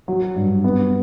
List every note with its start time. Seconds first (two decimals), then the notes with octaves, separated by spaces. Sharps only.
0.08 F#3
0.35 G2
0.64 B3